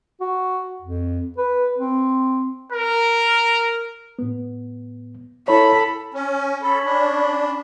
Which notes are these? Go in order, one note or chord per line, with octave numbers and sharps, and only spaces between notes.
F#4
F2
B4
C4
A#4
A2 B3
E4 A4 C#5 B5
C#4
C#4 A4 B5
D4